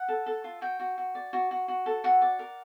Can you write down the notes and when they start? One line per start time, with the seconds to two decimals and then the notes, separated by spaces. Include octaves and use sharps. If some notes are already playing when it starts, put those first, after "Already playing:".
Already playing: F#5
0.08 A4
0.26 A4
0.44 F4
0.61 F#4 G5
0.79 F#4
0.98 F#4
1.15 D5
1.33 F#4
1.51 F#4
1.68 F#4
1.86 A4
2.04 F#4 F#5
2.22 D5
2.39 A#4